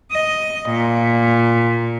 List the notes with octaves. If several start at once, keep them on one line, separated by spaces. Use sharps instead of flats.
D#5
A#2